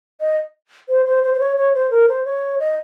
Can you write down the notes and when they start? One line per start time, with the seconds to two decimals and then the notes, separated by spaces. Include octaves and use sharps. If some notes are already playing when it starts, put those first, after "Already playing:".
0.21 D#5
0.89 C5
1.06 C5
1.23 C5
1.34 C5
1.40 C#5
1.57 C#5
1.74 C5
1.91 A#4
2.09 C5
2.25 C#5
2.60 D#5